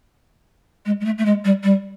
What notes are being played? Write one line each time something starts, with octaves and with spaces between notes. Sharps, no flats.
G#3
G#3
A3
A3
G#3
G3
G3